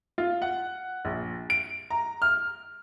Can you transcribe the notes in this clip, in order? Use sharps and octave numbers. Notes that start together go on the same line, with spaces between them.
F4
F#5
A#1
D7
A#5
F6